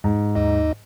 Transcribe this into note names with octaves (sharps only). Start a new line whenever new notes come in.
G#2
D#2 D#4 D#5